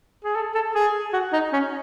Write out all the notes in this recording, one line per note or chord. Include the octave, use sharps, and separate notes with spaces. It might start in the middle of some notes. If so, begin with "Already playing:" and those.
G#4
A4
A4
G#4
F#4
D#4
C#4